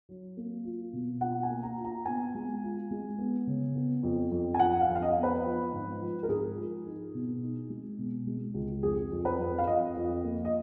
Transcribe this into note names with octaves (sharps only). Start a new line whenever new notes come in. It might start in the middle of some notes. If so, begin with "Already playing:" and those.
F#3
A#3
F4
B2
F4 F#5
G#5
A#3
A#5
F4
A#5
B3 G#5
G#3
F4
G#3
B3
C#3
B3
F2
F2
G#5
F3 F#5
F5
F2
F5
D#5
B3
B4
F3
G#2
F3
A#4
G#2 G#4
F3
D#4
B2
D#4
G#3
B2
G#3
C#2
F2 G#4
F2
B4
F2
F5
F2 D#5
F2
A#3
D#5